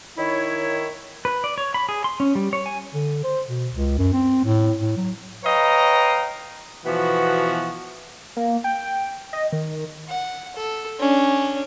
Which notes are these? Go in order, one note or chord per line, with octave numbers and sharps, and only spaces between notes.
D#3 E4 C#5
B4
D5
C#5
B5
G#4
C6
C#4
G3
C#5
G#5
D3
C5
B2
C#2
F#2
C4
A2
A2
F#3
B4 C#5 D#5 F5 G5 A#5
B2 E3 F3 B3 F#4
A#3
G5
D#5
D#3
F#5
A4
C#4 D4